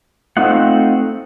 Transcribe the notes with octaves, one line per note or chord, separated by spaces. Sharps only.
A3 C4 D#4 F4 F#5